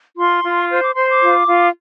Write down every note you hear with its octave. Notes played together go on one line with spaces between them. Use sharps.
F4 C6
F4
C5
D6
C5 C6
D6
F4
F4